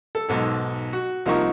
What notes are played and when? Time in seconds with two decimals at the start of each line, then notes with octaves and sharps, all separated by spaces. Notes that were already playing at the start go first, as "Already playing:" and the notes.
0.15 A4
0.29 B1 G#2 A4
0.93 F#4
1.26 C2 F3 A#3 D#4 A#5 C#6